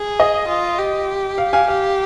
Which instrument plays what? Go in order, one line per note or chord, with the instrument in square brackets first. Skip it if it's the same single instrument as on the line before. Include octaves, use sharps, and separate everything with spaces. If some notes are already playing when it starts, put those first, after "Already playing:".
Already playing: [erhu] G#4
[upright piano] D#5
[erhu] F4
G4
[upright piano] F5
F5 G#5
[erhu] G4 [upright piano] F5